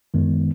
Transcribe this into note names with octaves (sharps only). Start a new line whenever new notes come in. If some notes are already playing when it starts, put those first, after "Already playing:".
F#2 D#3 G#3 B3